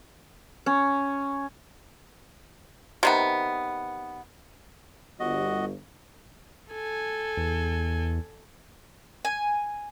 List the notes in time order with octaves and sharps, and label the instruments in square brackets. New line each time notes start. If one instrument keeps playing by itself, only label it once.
[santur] C#4
[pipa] C3 D#3 B3
[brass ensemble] G1 [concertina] F#4 D#5
[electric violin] A4 G#5
[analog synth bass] E2
[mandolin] G#5